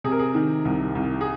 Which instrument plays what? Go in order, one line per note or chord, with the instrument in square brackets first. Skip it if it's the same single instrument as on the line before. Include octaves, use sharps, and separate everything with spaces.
[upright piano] C3 G#4
A#4
G#4
D#3
C2
C2
G#4